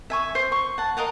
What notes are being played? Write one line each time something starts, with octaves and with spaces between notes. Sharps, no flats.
E5 G#5 C#6
C5
C#6
F#5 A5
A#4 D#5 F5 F#5